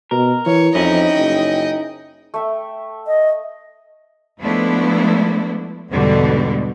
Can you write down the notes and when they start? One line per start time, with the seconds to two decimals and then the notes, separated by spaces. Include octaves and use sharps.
0.11 B2 A#4
0.46 E3 C#5
0.75 F2 C#4 D#4 E4 D#5 G5
1.16 F#1
2.34 A3 E5 G5
3.07 D#5
4.40 F3 G#3 A3 B3 D4 E4
5.90 E2 G#2 B2 D3 G3